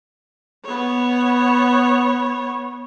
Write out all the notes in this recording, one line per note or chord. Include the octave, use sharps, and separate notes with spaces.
B3 C#5